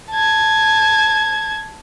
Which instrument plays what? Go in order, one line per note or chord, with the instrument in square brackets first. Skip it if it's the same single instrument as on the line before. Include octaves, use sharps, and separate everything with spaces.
[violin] A5 G#6